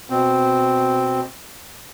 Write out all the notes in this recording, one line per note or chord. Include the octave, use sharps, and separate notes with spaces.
B2 C4